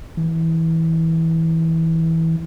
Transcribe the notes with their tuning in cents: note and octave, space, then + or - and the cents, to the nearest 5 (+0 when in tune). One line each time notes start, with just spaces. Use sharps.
E3 -20